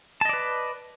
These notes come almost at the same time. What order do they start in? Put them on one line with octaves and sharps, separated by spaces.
A5 D#5 D5 B4